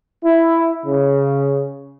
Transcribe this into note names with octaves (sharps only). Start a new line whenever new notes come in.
E4
C#3